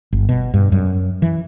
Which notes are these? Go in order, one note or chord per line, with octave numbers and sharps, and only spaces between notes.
G1
B2
G2
F#2
E3